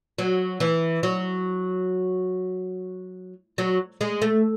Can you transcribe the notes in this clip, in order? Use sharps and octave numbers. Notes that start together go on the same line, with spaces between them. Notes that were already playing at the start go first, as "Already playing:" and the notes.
F#3
E3
F#3
F#3
G#3
A3